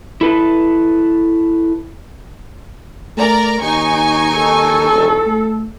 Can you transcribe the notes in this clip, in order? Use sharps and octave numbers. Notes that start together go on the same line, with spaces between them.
E4 A4 B4
A3 A#4 D5 A#5
D#2 D#4 G#5 C#6
A4
E1
A3